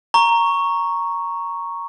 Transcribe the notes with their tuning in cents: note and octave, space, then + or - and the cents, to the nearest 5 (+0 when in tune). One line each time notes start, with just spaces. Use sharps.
A#5 +0 C#6 +0